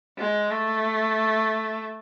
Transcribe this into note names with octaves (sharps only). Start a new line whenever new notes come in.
G#3
A3